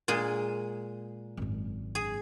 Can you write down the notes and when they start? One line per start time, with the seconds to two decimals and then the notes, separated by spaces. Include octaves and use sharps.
0.08 A#2 G#3 G#4
1.37 G#1 F#2
1.95 G#4